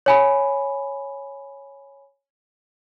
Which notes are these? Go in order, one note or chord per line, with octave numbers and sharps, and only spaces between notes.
C#5 G#5 B5